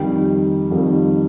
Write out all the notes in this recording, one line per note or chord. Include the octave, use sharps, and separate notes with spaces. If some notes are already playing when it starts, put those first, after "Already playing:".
Already playing: F2 D#3 G3 G5
F2 D#3 G3